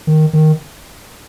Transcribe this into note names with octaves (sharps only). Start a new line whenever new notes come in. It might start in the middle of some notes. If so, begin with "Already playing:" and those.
D#3
D#3